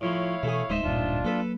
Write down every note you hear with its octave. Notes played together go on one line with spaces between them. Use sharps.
A2 F3 E4 C#5 F5
B2 E3 A3 G#4
D1 G#3 D#4 C5 E5
D1 G2 A#2 D4 F4
F#3 A#3 A4 B4